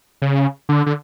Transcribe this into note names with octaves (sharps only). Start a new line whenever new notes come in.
C#3
D3
D3